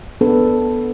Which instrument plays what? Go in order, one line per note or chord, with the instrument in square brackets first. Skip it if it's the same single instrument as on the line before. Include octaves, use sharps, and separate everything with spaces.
[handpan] B3 D4 A4 B4